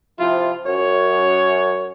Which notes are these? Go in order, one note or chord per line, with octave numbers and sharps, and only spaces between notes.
C3 F3 E4 F4
F#2 C#5